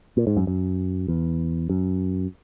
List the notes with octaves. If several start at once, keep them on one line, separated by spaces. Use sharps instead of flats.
A#2
G#2
F#2
F#2
E2
F#2